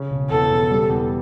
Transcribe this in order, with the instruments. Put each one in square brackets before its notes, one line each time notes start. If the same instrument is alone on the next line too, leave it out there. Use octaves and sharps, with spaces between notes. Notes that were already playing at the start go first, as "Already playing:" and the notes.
Already playing: [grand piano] C#3 C#4
E1
[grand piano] E2 [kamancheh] A4
[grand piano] E1
G3
E2